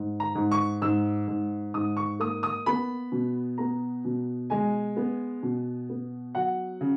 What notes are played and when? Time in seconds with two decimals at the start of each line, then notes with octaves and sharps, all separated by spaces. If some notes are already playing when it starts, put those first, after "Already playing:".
Already playing: G#2
0.20 A#5
0.35 G#2
0.51 C#6
0.82 G#2 E6
1.28 G#2
1.74 G#2 D#6
1.97 C#6
2.19 A#3 D#6
2.43 D#6
2.66 B3 B5
3.12 B2
3.58 B3 A#5
4.05 B2
4.50 G#3 G#5
4.96 B3
5.43 B2
5.89 B3
6.35 F#3 F#5
6.81 C#3